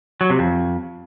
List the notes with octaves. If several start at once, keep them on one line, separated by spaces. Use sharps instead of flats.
F#3
C3
F2